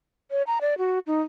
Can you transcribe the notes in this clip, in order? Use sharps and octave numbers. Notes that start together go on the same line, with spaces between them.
C#5
A#5
D5
F#4
D#4